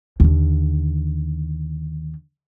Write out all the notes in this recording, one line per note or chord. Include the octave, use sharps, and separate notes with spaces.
D#2 D3